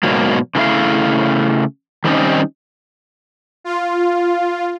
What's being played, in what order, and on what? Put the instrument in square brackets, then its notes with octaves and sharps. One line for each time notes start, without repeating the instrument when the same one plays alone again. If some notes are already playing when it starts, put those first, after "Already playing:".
[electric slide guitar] G#2 B2 F#3 A#3
C#3 F3 A3 E4 F5
D#3 G3 C4 C#4 D#4
[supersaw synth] F4